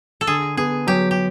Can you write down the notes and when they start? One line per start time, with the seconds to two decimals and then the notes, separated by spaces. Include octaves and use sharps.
0.21 A4
0.27 D3 G#4
0.57 B3 G#4
0.87 F#3 G4
1.11 G4